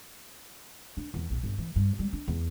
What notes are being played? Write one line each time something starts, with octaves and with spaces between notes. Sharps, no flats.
D4
E2
A#1
G1
E3
G2
G3
D4
E2